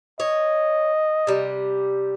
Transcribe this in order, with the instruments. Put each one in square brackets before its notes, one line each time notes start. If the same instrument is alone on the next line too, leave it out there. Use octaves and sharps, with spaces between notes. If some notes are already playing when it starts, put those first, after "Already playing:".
[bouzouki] C#5 [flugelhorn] D#5
[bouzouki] C3 G3